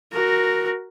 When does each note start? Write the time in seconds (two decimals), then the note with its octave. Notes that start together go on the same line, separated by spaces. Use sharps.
0.13 F#4 A#4